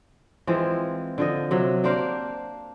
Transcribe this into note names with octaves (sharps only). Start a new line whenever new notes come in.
E3 F3 G#3 C4
D3 F3 D#5
C3 F#3
A#3 D4 C5 F5